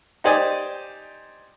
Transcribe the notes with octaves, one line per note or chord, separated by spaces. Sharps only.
D#4 G4 C5 D5 G#5 D#6